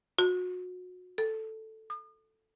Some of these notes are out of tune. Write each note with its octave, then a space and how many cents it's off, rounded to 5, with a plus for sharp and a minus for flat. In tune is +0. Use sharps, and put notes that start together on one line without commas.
F#4 -30
A4 +0
D#6 -40